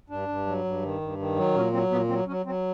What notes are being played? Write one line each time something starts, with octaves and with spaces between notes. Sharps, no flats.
G2 D4
G2
F#3
G2
D#3
G2
D#3
F#3
A#2 C#4
F#3 C4
A#2 B3
F#3 C4
F#3 C#4
F#3 C4